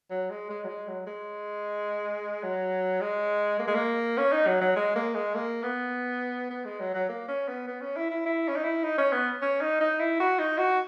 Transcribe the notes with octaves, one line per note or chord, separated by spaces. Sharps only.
F#3
G#3
G#3
F#3
G#3
F#3
G#3
F#3
G#3
A#3
G#3
A#3
C#4
D#4
F#3
F#3
G#3
A#3
G#3
A#3
B3
B3
G#3
F#3
F#3
A#3
C#4
B3
B3
C#4
E4
E4
E4
C#4
D#4
E4
D#4
C#4
B3
C#4
D#4
D#4
E4
F#4
D#4
F#4